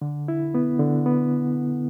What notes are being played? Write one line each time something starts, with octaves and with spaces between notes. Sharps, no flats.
D3
E4
B3
D3
B3